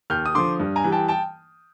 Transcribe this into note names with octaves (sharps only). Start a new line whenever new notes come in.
D#2 F6 G6
D#6
D3 F3 C6 D6
G2
G#5 A#5
E3 G3
G5 A5
G5 A5